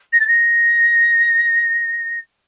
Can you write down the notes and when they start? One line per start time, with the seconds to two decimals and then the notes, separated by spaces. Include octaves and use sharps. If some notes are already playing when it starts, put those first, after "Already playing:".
0.12 A#6
0.20 A6
0.27 A#6